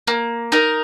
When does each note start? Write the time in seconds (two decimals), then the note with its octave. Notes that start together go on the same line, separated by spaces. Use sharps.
0.07 A#3
0.52 D#4 A#4